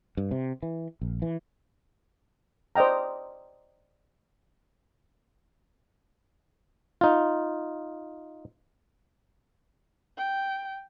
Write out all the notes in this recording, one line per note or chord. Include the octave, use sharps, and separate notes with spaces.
G2
C3
E3
A#1
E3
C5 D5 D#5 G5 A#5
D#4 F4
G5